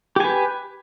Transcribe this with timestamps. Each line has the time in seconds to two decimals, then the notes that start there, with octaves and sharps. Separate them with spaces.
0.16 G4
0.20 G#5
0.24 B4